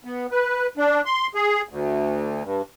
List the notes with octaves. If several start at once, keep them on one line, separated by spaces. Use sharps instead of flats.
B3
B4
D4
C6
G#4
D2
G2